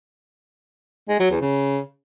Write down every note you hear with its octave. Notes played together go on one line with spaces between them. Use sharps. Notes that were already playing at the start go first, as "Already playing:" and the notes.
G#3
F#3
E2
C#3